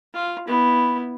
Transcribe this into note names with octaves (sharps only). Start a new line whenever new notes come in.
F4
B3 E4